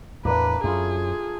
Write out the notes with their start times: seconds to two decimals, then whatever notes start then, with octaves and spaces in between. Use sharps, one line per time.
0.25 E2 A2 A#3 D4 B4
0.64 F#2 A3 F4 G#4 B5